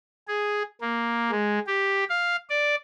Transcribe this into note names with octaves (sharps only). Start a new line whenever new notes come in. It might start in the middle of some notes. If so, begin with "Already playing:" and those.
G#4
A#3
G#3
G4
F5
D5